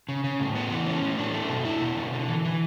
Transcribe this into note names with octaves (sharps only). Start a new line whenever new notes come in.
C#3
C#3
A2
B3
E3
C#4
A2
D4
A3
B2
E4
B2
D3
D3
E3
E3